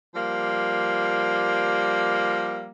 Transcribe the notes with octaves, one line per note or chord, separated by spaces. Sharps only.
F3 G3 A#3